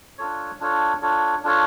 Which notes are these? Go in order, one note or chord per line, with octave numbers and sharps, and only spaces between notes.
D4 F4 A4 C#5
D4 F4 A4 C#5
D4 F4 A4 C#5
D4 F4 A4 C#5